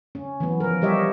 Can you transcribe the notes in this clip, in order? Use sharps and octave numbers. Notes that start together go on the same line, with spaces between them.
C#4
E3 F#3 B3
F3 A#4
G3 G4 C#5 D#5 E5